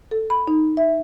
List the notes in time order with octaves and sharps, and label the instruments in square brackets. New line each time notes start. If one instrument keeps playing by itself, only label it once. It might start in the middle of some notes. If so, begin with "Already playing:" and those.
[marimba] A4
B5
D#4
E5